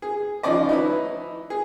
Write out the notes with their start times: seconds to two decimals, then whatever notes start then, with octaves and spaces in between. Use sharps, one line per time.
0.02 G#4
0.43 D#3 F3 C#4 D5 D#5
0.69 D#4 E4 B4
1.50 G#4